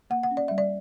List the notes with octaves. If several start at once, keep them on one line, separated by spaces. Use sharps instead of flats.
A#3 F#5
F#5
C#4
D5
G3 E5
D5